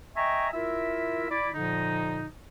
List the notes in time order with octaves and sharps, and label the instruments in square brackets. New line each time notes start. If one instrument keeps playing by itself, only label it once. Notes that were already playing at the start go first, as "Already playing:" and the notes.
[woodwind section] D#5 E5 G5 G#5 A#5 C#6
E4 F4 A#4 E5
E4 D5 B5
A#2 D3 F3 D#4